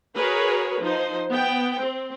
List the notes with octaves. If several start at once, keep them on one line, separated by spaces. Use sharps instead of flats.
F#4 G#4 A#4 B4 C#5
F3 D#4 C5
B3 G5
C4